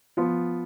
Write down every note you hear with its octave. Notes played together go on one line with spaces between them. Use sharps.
F3 B3 F4